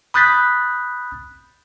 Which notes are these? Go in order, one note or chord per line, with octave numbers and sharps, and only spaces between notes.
B5 D#6 F#6 G6 A6 B6